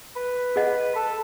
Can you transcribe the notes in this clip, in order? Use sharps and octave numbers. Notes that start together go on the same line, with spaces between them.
B4
G#4 D#5 F#5
A4